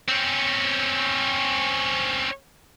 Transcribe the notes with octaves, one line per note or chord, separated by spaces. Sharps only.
C4 C#4